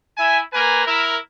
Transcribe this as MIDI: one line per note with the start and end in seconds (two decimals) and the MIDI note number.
0.17 0.40 64
0.17 0.40 76
0.17 0.40 80
0.53 0.84 58
0.53 0.84 70
0.53 0.84 71
0.53 0.84 80
0.85 1.16 64
0.85 1.16 70